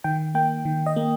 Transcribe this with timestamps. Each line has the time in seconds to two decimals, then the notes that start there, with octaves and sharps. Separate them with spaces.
0.04 D#3 G5
0.34 A#3 G5
0.65 D#3
0.86 D#5
0.96 A#3